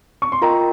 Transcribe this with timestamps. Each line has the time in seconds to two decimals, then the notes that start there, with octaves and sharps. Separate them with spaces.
0.22 C#6
0.32 C6
0.42 F4 A#4 D#5 G5 A#5